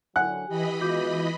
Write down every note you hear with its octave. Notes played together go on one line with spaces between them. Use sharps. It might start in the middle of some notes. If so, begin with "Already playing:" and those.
D3 F#3 F#5 G#5 F#6
E3 G4 D#5 B5
G#3 B3 F4 F#4 D6 G6